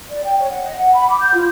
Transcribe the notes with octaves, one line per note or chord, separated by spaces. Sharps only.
D5
G5
C#5
F#5
D#5
F#5
B5
D6
G6
F4